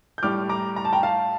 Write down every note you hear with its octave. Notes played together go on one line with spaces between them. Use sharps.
G6
A2 G3 D6 F6
A#5 D6
A#5
A5
G5 A#5
F5 A5